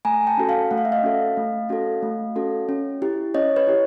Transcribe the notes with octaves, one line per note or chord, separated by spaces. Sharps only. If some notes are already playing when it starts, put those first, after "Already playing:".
A3 G#5 A#5
G5 A5
C#4 F#4 A4
F5 G5
A3 F#5
F5
E5
D#5 F5
C#4 F#4 A4
A3
C#4 F#4 A4
A3
C#4 F#4 A4
C#4
E4 G4
C#4 C#5 D#5
B4 C#5
E4 G4